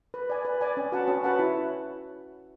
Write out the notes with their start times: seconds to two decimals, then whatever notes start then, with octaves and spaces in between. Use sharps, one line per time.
0.14 B4
0.30 D5 G#5
0.45 B4
0.61 D5 G#5
0.77 C#4
0.92 F#4 B4 F#5 A5
1.08 C#4
1.23 F#4 B4 F#5 A5
1.39 E4